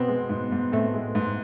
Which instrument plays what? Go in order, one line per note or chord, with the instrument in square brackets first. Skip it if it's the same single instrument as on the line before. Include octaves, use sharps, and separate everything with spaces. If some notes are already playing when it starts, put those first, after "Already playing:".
Already playing: [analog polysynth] B2 B3 [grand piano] C4
[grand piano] G#3
G#2
G#2
[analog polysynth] A2 A3 [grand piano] C4
[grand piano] G#3
G#2